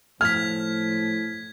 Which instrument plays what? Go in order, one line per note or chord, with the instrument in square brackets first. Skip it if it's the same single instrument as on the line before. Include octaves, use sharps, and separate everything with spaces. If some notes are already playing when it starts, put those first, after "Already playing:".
[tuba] A2 [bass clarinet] F3 [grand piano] F6 [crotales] G#6 B6